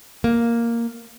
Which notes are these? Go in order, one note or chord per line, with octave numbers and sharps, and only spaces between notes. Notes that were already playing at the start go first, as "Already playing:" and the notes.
A#3